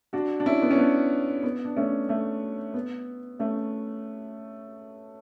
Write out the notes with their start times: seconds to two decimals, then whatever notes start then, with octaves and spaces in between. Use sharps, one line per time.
0.13 D4 F#4
0.40 D4
0.46 C#4 E4
0.62 B3
0.71 C#4
0.78 B3 D4
1.43 B3
1.65 D4
1.77 A3 C#4
2.09 A3
2.74 B3
3.39 A3 C#4